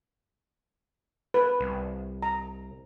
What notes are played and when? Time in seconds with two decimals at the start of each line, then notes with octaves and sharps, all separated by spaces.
1.34 B4
1.60 C2
2.22 A#5